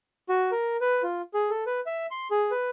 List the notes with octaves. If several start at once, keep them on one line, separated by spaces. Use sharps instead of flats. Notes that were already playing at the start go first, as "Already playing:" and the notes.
F#4
A#4
B4
F4
G#4
A4
B4
E5
C6
G#4
B4